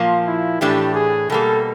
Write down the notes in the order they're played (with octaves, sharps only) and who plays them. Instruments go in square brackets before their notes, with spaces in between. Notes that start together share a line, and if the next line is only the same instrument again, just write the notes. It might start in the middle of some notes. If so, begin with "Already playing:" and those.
Already playing: [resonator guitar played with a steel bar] A#2 F3 A#3
[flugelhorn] E4
[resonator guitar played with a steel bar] A2 E3 A3 D4 [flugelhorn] G4
[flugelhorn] G#4
[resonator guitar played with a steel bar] B2 G3 A#3 [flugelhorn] A4